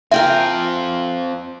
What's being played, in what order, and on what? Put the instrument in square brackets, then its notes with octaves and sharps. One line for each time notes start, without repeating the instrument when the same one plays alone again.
[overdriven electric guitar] C4 F4 [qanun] A#4 G5 G#5 [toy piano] E5